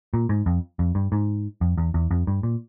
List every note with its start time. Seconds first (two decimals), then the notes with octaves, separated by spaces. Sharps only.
0.14 A#2
0.29 G#2
0.46 F2
0.79 F2
0.95 G2
1.12 G#2
1.61 F2
1.78 E2
1.94 E2
2.11 F2
2.27 G2
2.43 A#2